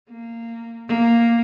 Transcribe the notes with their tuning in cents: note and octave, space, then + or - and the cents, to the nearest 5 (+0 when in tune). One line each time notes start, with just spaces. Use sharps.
A#3 -15
A#3 +0